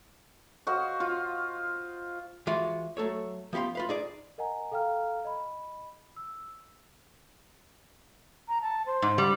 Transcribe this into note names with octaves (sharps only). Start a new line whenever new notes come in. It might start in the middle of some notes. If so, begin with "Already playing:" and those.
F#4 C5 D#5 F5
F4
E3 G#3 F4 F#4
F#3 A3 A4 C#5
F3 B3 G4 F5 C6
F4 B4 F5
D#4 G#4 D5
A#4 D#5 F#5 G#5 A#5
A4 F5 G5 A#5 F6
D#5 B5
E6
A#5
A5
C5
G#2
G3